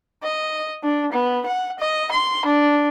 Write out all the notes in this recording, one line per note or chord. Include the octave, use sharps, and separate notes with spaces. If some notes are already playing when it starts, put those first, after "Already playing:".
D#5
D4
B3
F#5
D#5
C6
D4